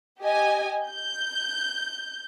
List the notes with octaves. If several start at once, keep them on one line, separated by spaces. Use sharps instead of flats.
G4 D#5 G#5
G6